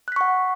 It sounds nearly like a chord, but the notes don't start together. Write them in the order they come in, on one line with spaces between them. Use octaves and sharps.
F#6 B6 C#6 F#5